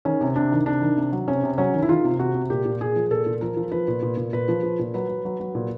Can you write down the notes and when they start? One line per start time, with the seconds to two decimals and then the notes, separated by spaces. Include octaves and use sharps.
0.05 D#3 C#4
0.21 C3
0.36 C3 D4
0.52 D#3
0.66 C3 D4
0.82 D#3
0.97 C3
1.12 F#3
1.28 C3 C#4
1.43 C3
1.58 F#3 C#4
1.74 D#3
1.82 E4
1.89 D#3 F4
2.04 C3
2.19 C3 F#4
2.34 C3
2.50 A#2 G4
2.65 A#2
2.81 A#2 G#4
2.95 F3
3.11 A#2 A4
3.26 A#2
3.41 F3 A#4
3.57 F3
3.72 F3 B4
3.88 A#2
4.02 A#2
4.17 A#2
4.33 A#2 B4
4.48 F3
4.63 F3
4.79 A#2
4.94 F#3 B4
5.09 F#3
5.25 F#3
5.40 F#3
5.55 A#2